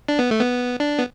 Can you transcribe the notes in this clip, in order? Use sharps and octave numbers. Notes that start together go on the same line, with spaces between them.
D4
B3
A3
B3
D4
B3